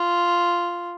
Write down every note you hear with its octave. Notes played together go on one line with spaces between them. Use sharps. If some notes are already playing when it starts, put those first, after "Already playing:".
Already playing: F4